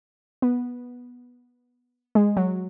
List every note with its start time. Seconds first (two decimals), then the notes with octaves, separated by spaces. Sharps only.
0.42 B3
2.15 G#3
2.37 F#3